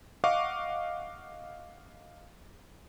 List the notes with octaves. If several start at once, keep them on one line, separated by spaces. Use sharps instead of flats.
D#5 F5 F#5 C#6 D6